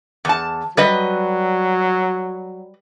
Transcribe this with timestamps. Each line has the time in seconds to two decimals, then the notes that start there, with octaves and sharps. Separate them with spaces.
0.25 E2 A5
0.77 F#3 G3 B4 D#5